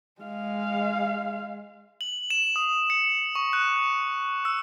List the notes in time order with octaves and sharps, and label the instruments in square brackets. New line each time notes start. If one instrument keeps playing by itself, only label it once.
[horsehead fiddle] G#3 F5
[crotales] F#7
E7
D#6
C#7
C#6
F#6
E6